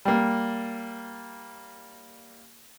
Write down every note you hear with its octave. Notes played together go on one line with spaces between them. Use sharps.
G3 A#3